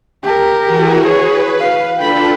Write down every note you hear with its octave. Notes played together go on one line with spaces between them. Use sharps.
G4 A#4
E3 F#4 G#4
G#4 B4 C#5
F5
D4 F4 A4 G5 B5